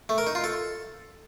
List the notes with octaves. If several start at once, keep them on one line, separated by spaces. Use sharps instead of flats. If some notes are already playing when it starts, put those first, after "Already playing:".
A3
A#4
D#4
F4
A4